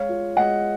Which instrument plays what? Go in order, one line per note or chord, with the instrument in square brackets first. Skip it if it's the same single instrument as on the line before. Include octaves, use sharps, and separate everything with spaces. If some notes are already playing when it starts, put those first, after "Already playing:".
Already playing: [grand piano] G#3 C#5 F5
F4
G#3 D#5 F#5